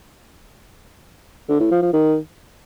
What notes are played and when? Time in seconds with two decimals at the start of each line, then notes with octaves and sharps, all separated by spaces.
1.49 D3
1.60 A2
1.71 F3
1.82 F3
1.93 D#3